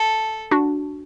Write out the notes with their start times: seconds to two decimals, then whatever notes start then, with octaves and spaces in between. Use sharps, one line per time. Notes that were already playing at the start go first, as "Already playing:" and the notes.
Already playing: A4
0.51 D4 F#4